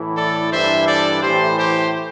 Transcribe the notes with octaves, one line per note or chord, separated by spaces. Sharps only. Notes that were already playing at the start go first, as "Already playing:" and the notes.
Already playing: A2 E3
A4 D5
G2 E3 C5 E5
A4 D5
A2 E3 G4 C5
G4 C5